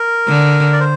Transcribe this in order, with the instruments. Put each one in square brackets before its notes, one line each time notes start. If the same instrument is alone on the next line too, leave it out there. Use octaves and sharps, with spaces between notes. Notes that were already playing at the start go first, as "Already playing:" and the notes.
Already playing: [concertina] A#4
[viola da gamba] D3
[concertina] D5
C5